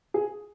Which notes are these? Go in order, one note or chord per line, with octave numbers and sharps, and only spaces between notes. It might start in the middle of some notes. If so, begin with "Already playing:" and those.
G#4